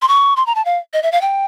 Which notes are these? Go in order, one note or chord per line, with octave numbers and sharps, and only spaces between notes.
C6
C#6
C6
A#5
A5
F5
D#5
E5
F5
G5